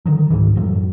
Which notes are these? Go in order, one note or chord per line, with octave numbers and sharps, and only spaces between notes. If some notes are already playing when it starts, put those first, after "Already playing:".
D3 D#3 F#3
C#2 G#2 D#3 E3
F#2 A2 F#3 A3